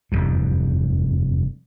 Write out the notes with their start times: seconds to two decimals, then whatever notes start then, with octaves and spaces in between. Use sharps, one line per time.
0.12 F1 E2 G2